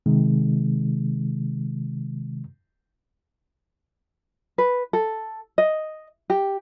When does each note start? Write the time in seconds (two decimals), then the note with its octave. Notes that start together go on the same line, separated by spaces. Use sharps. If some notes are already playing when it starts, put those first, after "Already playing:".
0.06 C3 D#3 G#3
4.58 B4
4.93 A4
5.58 D#5
6.30 G4